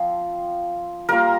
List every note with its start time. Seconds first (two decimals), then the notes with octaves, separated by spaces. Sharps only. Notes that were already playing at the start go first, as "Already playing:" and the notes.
Already playing: F3 C4 F4
1.09 G3 A#3 F4 A#4